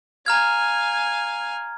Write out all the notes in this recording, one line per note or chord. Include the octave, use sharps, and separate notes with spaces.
F5 G#5 A#5 F6 G#6